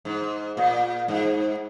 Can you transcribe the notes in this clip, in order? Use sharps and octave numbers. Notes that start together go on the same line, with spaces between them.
G#2
A#2
G#2